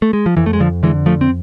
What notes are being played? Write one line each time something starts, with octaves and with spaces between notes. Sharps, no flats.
A3
G#3
F3
F2 E3
A3
G#3
D3 F3
D3 E3 G#3
F3 A3
C4